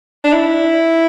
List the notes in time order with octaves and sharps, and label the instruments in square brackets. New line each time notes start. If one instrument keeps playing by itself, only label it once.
[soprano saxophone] D4
E4